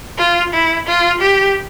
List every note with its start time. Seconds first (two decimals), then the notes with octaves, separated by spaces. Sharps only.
0.18 F4
0.53 E4
0.87 F4
1.21 G4